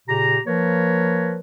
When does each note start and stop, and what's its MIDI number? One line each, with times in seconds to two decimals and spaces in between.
0.09 0.39 46
0.09 0.39 49
0.09 0.39 67
0.09 0.39 82
0.46 1.40 53
0.46 1.40 58
0.46 1.40 70
0.46 1.40 71
0.46 1.40 73